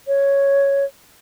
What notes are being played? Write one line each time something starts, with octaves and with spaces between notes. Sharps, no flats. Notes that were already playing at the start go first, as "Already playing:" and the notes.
C#5